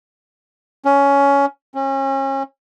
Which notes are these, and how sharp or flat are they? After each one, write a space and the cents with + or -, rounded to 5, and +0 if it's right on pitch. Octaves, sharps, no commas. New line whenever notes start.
C#4 +15
C#4 -35